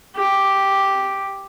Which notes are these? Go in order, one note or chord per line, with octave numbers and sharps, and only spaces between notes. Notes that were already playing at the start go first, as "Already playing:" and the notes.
G4